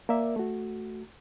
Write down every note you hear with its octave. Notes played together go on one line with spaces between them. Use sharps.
A#3 A#4 D5 E5
A3 F#4